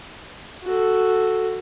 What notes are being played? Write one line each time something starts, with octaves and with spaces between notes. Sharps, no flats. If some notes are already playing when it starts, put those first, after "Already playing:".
F#4 A4